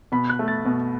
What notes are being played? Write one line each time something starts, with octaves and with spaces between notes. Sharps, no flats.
B2 B5
F#6
A3
A6
B2